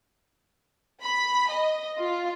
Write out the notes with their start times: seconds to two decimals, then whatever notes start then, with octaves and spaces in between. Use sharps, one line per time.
1.03 B5
1.50 D#5
1.99 F4